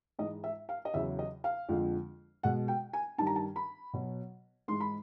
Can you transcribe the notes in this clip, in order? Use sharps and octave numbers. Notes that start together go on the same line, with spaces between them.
G#2 E3 G#3 D#5
E5
F5
D#5
E2 C#3 F#3 E5
D#5
F5
F2 D3 F3 G#3
B2 G#3 F#5
G5
G#5
G2 D#3 G3 A5
A#5
A5
B5
B2 F#3
G#2 E3 G#3 C6
B5